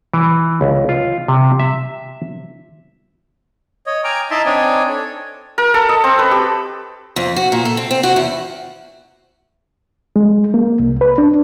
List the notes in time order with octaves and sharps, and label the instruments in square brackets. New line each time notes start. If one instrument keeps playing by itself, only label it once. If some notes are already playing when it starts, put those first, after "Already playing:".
[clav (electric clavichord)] E3
C#2
F4
C3
E5
[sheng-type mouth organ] C#5 D#5
G5 G#5 A#5 D6 F6
D#4 E4 E5 A5 A#5 C6
C4 D4 D#4 C#5 D5 G#5
A4 C#5
[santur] A#4
A4
D#5
C4
B4
G4
[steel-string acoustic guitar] F2
F#4
A#2
A4
C4
C4
F#4
E2
[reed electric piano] G#3
A#3
C2
B4
D4